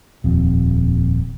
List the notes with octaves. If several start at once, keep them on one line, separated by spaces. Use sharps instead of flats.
D#1 F2